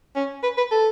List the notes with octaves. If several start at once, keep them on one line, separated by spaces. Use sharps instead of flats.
C#4
B4
B4
A4